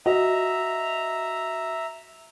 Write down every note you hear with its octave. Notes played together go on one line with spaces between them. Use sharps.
F#4 D#5 E5 A#5